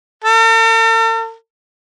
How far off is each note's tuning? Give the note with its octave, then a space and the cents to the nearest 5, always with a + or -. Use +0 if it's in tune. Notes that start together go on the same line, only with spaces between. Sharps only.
A4 +45